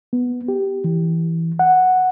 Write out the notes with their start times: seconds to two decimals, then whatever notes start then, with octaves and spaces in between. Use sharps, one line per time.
0.13 B3
0.48 G4
0.84 E3
1.59 F#5